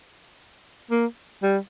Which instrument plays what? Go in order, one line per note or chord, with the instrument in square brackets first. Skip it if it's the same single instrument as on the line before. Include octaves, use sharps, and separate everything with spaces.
[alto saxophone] A#3
G3